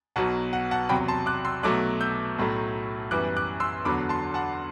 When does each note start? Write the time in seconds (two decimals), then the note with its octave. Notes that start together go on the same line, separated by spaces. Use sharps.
0.16 B1 B2 F#3 F#5 A5
0.53 F#5
0.71 F#5 A5
0.89 E2 C3 F#3 G5 B5
1.08 A5 C6
1.26 D6 F#6
1.45 C6 E6
1.63 B1 B2 F#3 A3 D6 F#6
2.01 E6 G6
2.38 B1 A2 F#3 A3
3.11 F#2 E3 G3 B3 D6 F#6
3.37 D6 F#6
3.60 C6 E6
3.85 E2 D3 F#3 B5 D6
4.09 A5 C6
4.34 F#5 A5